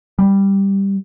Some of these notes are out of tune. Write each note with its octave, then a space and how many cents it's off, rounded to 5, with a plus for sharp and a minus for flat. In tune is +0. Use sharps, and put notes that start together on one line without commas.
G3 +5